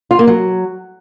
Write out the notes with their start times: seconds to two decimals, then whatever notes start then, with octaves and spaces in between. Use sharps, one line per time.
0.11 F4
0.19 A#3
0.27 F#3